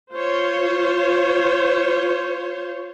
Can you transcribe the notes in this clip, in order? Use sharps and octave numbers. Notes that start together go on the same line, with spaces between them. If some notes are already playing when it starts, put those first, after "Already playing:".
F4 C5 C#5